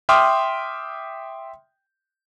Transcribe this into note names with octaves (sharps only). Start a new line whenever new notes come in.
E5 G5 C6 D6 D#6 F6